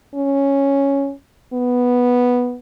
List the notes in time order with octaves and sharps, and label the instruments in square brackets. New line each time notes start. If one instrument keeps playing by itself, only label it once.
[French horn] C#4
B3